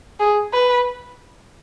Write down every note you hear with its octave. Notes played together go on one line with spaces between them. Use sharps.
G#4
B4